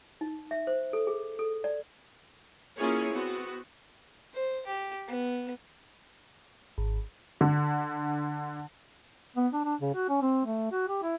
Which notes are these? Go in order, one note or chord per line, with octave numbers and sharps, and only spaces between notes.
D#4
E5
C5
A4
G#4
A4
D5
A#3 C#4 E4 F4 G#4 C#5
B3 C4 F#4
C5
G4
B3
G#1
D3
B3
D4
D4
C#3
F#4
C#4
C4
A3
F#4
G4
E4